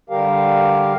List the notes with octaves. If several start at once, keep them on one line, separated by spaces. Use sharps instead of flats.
D3 G3 G4 A#4 F5